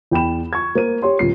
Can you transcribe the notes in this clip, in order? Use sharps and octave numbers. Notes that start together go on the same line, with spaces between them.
E2 G5 B5 E7
C#6 G#6
A#3 C5 D#7
G4 C#5 C6
D1 C#2 C7